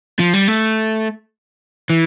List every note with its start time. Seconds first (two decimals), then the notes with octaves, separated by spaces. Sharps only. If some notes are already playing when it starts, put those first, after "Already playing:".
0.19 F3
0.34 G3
0.48 A3
1.90 E3